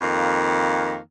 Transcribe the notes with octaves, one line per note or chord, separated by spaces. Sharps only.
F2 D#3 A#3